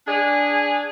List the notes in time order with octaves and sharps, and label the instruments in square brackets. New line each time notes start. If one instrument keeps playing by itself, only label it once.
[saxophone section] D4 G#4